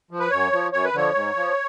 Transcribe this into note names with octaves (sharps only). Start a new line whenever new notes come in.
F3
B4
F#2 C#5
F3
F#2 C#5
B4
D3 F3 C#5
G#2
F3